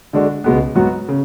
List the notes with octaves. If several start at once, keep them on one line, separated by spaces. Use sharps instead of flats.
D3 G#3 D4 F#4
C#2 B2 G#3 B3
G#2 F#3 B3 F#4
C#3